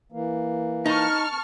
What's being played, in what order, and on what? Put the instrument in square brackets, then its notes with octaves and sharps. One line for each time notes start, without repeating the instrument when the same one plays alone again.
[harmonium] E3 A#3
[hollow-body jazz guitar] D#4 [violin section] A5 C#6 F6